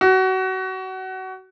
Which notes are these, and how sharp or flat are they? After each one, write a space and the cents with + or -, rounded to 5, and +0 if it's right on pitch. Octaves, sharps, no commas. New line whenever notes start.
F#4 +25